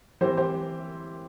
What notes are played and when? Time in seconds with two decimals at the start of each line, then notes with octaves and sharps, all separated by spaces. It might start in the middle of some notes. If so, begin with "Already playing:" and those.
0.21 E3 C4 G4 C5
0.37 G4 C5